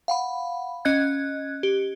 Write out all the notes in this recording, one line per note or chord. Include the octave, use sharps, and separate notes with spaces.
F5 F#5 B5
C#4 D#5 F#6 G#6
G4